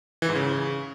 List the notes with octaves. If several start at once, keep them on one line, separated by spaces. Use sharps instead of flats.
E3
G#2
C#3